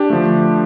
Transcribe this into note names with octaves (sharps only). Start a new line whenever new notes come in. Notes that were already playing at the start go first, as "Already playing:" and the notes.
Already playing: D4 G4
D3 F3 A3